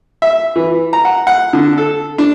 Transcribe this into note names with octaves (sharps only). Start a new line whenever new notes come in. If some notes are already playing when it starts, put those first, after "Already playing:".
E5
E3
A#5
F#5
F#5
D3
A4
D4